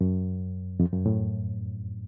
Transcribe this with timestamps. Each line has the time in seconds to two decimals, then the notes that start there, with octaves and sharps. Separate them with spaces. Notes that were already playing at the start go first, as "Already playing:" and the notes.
0.01 F#2
0.80 F2
0.93 F#2
1.06 A2